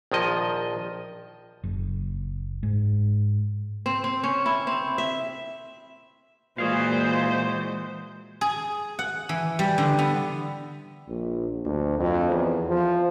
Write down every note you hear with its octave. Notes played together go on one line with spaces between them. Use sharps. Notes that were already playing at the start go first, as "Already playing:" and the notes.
A#1 D#3 F3 D#5
F#1
G#2
C4
C4
C#4
E4
C4
E5
A#2 E3 G#3 F#4 G#4 C5 F5
G#4
F#5
E3
G3
D3
B3
A#1
D2
F2
E2
F3